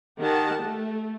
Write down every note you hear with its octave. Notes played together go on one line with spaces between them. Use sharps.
D#3 G4 F#5 A5
A3